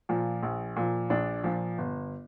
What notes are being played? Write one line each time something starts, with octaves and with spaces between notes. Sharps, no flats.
A#2 F3
A#1
A#2 F3
A#1 D4
A#2 F3
G1